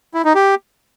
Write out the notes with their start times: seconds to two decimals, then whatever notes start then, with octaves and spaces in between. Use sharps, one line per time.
0.14 E4
0.25 D#4
0.35 G4